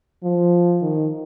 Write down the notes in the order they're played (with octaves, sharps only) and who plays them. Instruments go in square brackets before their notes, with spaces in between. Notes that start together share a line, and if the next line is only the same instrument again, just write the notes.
[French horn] F3
D#3